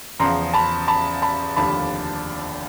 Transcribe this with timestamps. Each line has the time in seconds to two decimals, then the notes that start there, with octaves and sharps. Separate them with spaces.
0.20 E2 C#3 F3 A#5 C6
0.54 A5 B5
0.88 A5 B5
1.22 A5 B5
1.57 F1 D#2 D3 F3 A5 B5